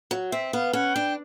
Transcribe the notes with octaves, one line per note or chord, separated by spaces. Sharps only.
F#3
C4 E5
B3 F5
C#4 F#5
D4 G5